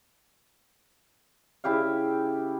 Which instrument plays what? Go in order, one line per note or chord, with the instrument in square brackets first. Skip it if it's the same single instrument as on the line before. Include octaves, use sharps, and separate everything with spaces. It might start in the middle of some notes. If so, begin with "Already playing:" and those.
[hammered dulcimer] C#3 E4 G4 F5